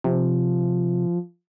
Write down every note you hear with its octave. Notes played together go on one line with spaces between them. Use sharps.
C3 F3